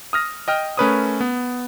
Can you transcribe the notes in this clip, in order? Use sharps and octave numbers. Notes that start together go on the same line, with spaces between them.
D#6 F6 A#6
D#5 G5 F6
A3 C#4 A#4 B4 C#5 D#6
B3